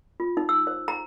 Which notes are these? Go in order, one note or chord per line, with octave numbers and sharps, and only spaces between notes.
F4
D#4
E6
C5
A#5